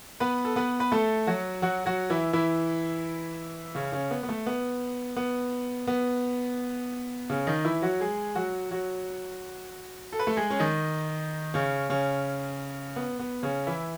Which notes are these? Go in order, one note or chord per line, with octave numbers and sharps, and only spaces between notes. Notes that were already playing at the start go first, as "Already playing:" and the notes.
B3 B4
A4
B3 B4
B4
A3 A4
F#3 F#4
F#3 F#4
F#3 F#4
E3 E4
E3 E4
C#3 C#4
C#3 C#4
B3
B3
A3
B3
B3
B3
C#3 C#4
D#3 D#4
E3 E4
F#3 F#4
G#3 G#4
F#3 F#4
F#3 F#4
A4
B4
A3 A4
G#3 G#4
C#4
D#3 D#4
C#3 C#4
C#3 C#4
B3
B3
C#3 C#4
E3 E4